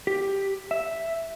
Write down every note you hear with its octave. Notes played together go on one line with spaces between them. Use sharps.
G4
E5